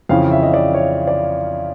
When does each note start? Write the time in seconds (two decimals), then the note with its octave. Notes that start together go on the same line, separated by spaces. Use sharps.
0.09 F2 C#3 E3 F5
0.32 E5
0.43 D#5
0.54 D5
0.74 C#5
1.07 D5